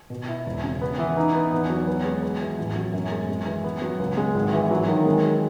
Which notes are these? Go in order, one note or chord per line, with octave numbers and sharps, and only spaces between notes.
B2
E4
E1
C#3
B3
E3
D#4
B3
E2
F#3
B3
G#3
B3
E3
A1
F#3
F#2
G#3
G#3
E3
B3
F#3
C#2
G#3
G#1
E3
F#3
D#3
G#3
D#3